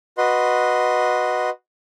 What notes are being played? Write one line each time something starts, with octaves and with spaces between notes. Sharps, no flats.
F#4 B4 D#5 C6